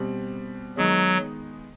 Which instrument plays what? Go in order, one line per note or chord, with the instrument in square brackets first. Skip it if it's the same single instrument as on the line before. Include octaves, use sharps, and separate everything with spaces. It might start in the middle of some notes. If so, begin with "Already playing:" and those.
Already playing: [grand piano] B2 G3 C4
[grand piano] D#3 G#3 B3 D#4 [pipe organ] F#3